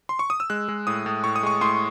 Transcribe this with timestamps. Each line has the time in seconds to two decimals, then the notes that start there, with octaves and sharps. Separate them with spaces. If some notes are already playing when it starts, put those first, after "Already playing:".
0.09 C6
0.19 C#6
0.30 D#6
0.40 E6
0.50 G#3 F#6
0.68 G#3
0.87 A2 D#6
1.06 A2
1.24 A2 C#6
1.36 D#6
1.43 G#3 C#6
1.61 A2 C6